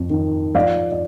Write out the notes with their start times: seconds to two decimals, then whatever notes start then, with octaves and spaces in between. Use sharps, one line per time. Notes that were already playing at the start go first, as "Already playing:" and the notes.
Already playing: F2
0.10 D#3
0.55 F3 D5 F5
0.92 D5